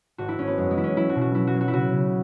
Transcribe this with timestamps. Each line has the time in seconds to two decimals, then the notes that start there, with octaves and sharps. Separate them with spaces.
0.18 G#1 F#4
0.28 E4
0.38 G#1 C#4
0.48 B3
0.58 F#2 G#3
0.71 G#3
0.77 E3 E4
0.84 C#4
0.96 F#3 E4
1.09 F#4
1.16 B2
1.21 F#4
1.34 F#3 E4
1.47 F#4
1.54 F#3
1.61 F#4
1.68 E4
1.73 C#3 F#4
1.93 C#3